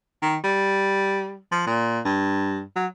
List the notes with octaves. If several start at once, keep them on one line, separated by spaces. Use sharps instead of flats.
D#3
G3
F3
A#2
G2
F#3